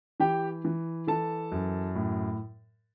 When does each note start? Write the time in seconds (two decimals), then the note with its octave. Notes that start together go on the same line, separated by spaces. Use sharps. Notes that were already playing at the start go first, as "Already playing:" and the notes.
0.20 E3 G4 G5
0.65 E3
1.07 E3 A4 A5
1.52 F#2
1.95 A2